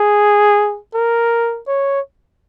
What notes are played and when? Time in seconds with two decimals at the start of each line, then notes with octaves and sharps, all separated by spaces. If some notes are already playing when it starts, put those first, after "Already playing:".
Already playing: G#4
0.94 A#4
1.67 C#5